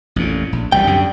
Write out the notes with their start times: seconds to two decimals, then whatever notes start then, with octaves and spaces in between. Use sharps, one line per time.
0.16 A1 F2 A#2
0.52 A#1
0.72 C2 D3 E3 G3 G5
0.87 F#2 D3